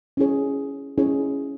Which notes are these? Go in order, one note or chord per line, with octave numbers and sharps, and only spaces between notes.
C#4 E4 G#4 C#5
C#4 E4 G#4 C#5